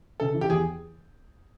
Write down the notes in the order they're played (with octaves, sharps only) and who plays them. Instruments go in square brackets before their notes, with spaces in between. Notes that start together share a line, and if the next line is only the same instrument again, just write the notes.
[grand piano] C#3 [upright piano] A4
[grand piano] E3
[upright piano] G4
[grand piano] E2 [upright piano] G#4